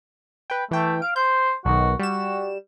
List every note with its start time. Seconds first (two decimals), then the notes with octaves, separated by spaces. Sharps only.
0.50 B4 G5
0.71 E3 A3 G5
1.02 F5 D7
1.16 C5 G6
1.65 B1 D#3 F#4
1.99 G3 F#4 E7